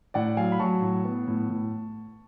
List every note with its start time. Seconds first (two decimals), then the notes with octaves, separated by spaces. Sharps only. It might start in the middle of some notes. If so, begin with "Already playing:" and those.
0.14 A2 D5 F#5
0.37 F#3 F5 G#5
0.52 B5
0.59 F#3 A5 C#6
0.82 A2
1.05 B3
1.27 A2
1.50 A2